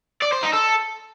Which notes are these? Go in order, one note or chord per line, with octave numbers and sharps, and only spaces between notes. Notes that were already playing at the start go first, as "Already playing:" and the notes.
D5
C5
D#4
A4